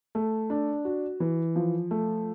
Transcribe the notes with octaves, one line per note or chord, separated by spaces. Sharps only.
A3
D4
F#4
E3
F3
A3